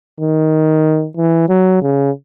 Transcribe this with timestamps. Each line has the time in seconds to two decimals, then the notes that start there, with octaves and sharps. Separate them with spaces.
0.20 D#3
1.17 E3
1.49 F#3
1.82 C#3